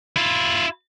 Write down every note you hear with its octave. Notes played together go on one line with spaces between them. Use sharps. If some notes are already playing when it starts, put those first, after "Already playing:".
E4 F4